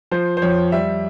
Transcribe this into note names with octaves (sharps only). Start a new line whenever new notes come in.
F3 C5
C5
F2 C#5
G3 E5